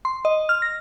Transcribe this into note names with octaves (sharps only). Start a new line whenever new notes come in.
C6
D#5
F6
A#6